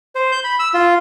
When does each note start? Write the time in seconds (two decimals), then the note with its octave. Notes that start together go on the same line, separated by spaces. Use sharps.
0.15 C5
0.32 G6
0.44 B5
0.59 E6
0.74 F4